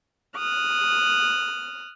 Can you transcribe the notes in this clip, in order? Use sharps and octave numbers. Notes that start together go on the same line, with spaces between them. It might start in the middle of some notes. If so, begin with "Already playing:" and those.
D#6 F6 F#6